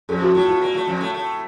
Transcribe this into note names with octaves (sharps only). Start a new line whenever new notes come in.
F2 F3 A4
F#4
A2 A3 F4
F4
A#2 A#3
A2 A3
F2 F3
A2 A3
A2 A3